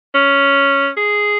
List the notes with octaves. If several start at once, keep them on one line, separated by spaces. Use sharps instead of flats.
C#4
G#4